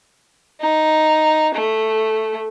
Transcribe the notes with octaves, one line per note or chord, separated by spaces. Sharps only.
D#4
A3